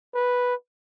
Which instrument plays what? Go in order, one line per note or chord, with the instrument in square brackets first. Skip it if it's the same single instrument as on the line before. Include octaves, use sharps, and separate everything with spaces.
[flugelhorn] B4